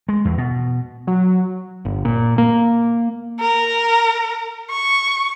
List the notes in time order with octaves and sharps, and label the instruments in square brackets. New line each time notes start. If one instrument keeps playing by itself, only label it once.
[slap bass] G#3
E2
B2
[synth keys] F#3
[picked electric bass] G1
A#2
A#3
[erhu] A#4
C#6